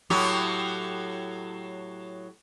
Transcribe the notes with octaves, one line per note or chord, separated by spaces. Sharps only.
A2 F#3 G4